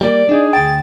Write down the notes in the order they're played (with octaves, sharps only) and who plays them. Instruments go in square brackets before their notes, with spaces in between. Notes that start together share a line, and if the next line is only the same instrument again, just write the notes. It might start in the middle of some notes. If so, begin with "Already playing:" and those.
[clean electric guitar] G3 A#3 [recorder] D5
[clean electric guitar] D4 D#4 [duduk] G#4
[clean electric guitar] D2 G5 [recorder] A6